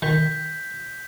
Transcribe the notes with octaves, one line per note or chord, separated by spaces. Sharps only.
D#3 G6 B6